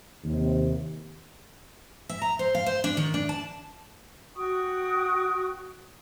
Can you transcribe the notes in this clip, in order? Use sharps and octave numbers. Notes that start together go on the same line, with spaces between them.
D#2 C3
E5
A#5
C5
F5
C5
D4
D#3
D4
A5
F#4 G5 C#6 D#6